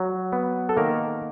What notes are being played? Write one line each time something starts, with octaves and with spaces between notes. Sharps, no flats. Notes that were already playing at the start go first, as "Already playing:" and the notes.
Already playing: F#3
B3
A4
D#3 A#3 A#4